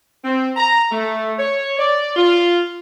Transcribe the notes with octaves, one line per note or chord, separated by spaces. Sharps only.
C4
A#5
A3
C#5
D5
F4